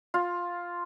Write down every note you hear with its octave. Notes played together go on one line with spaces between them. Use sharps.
F4